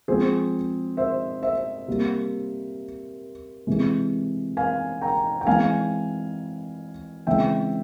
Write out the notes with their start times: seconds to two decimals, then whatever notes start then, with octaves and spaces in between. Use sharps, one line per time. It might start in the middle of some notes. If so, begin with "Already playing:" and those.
0.08 F3 G#3 C4 G#4 C5
0.97 C5 E5
1.43 C5 E5
1.88 C3 G3 A#3
3.67 C3 E3 G#3
4.57 F5 G#5
5.02 G5 A#5
5.41 G5
5.46 E3 G#3 C4 F5 G#5
7.27 C#3 E3 G#3 C4 E5 G5